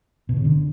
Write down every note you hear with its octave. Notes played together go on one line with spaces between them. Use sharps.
B2
C#3
D3